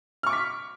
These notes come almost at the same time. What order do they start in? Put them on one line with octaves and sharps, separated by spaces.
F6 C#6 D6 B6